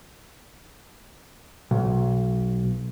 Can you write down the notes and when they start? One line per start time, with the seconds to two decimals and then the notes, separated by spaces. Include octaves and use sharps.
1.71 B1